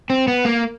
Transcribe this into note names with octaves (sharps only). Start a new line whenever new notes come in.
C4
B3
A#3